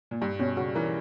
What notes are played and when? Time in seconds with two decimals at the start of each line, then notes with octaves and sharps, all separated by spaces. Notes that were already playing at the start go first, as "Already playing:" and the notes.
0.11 A#2
0.21 G2 G3
0.39 B2 C#4
0.57 C#3 F#4
0.75 E3 A#4